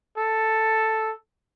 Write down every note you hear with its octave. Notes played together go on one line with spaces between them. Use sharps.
A4